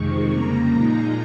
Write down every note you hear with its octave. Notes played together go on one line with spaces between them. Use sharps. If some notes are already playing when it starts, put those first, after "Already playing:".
Already playing: F2 C3 D#3 G#3 C4 C#6
F2 C#3 G3 A#3 A#5
A#2 F3 G#3 D#4